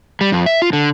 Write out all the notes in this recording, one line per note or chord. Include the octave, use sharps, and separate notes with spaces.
G3
F2
E5
F4
D3